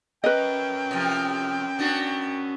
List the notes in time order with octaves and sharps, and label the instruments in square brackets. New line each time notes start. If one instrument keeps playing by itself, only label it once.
[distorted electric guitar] C#4 A#4 [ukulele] B4 D#5 [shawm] G5
[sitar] C3 F3
B3 D4 F#4